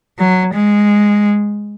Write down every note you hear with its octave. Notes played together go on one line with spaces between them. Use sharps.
F#3
G#3